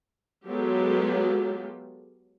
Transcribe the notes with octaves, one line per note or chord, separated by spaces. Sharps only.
F#3 G#3 B3 F4 G4 A4